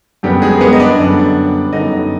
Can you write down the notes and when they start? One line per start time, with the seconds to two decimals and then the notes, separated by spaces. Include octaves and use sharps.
0.23 F#2 D3 G3 B3 G4
0.42 G#3 G#4
0.57 A#4
0.61 B3 B4
0.73 D#5
0.79 D4 D5
0.99 F#2 D3 G3 B3
1.72 F#2 D3 G3 B3 D#4 D#5